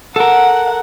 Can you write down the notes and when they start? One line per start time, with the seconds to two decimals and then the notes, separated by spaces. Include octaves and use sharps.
0.16 A4 A#4 F#5